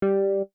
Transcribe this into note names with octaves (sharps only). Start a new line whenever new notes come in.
G3